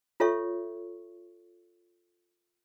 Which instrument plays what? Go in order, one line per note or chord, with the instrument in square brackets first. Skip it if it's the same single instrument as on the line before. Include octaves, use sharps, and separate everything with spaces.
[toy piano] F4 A4 C#5 E5 C#6